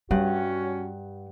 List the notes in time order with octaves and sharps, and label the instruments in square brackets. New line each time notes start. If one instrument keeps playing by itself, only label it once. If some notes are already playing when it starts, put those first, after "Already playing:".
[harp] G2 F#5 [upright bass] G3 [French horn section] C#4 F#4